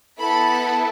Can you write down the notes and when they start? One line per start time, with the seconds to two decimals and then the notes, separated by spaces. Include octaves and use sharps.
0.19 B3 E4 A4 B5